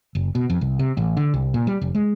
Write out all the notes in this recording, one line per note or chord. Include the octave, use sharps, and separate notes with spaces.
F#1
B2
F2
C2
C3
A1
D3
C2
A#2
G3
F1
G#3